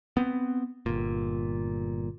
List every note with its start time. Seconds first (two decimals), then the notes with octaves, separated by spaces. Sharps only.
0.17 B3 C4
0.86 G1 A#2